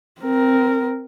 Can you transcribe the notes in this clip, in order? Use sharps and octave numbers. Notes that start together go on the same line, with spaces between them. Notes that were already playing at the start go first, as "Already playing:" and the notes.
C4 A#4